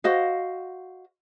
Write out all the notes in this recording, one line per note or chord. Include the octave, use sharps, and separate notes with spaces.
F#4 C5 D#5 F5